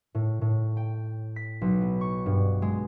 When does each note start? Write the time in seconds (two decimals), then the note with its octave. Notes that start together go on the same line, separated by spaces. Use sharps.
0.15 A2
0.41 A2
0.77 G5
1.36 B6
1.61 B1
1.82 B3
2.01 C#6
2.26 G2
2.62 G#3